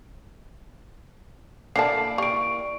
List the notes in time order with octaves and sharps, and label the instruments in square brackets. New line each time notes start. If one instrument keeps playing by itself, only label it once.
[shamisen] D3 G3 A5 [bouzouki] A#3 E4 D5 [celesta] C7
[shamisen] G4 [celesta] C#6 D7